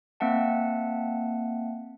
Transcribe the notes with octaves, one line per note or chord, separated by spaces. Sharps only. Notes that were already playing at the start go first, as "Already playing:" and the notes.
A#3 C4 E5 F#5 A5